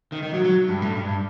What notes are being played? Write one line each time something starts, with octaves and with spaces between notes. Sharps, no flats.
D#3
D#3
F#3
F#3
G2
A2
G2